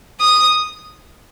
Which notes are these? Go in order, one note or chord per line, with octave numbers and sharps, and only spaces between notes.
D#6